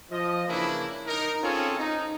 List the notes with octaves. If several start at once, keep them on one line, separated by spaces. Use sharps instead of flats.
F3 D#5
C#3 E3 A#3 D4 E4
D#4 A#4
C4 C#4 F4 G#4 A4 C#5
D#4